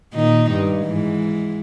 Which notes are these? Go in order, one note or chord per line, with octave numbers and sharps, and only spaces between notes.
A#2 D#3 D#4
G2
G#2 E3